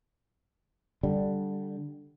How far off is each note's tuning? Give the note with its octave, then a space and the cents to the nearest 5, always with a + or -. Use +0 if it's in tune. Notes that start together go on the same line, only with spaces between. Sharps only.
D3 +0 G3 +0